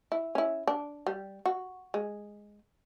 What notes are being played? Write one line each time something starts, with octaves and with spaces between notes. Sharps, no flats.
E4
C#4 E4
D4
G3
F#4
G#3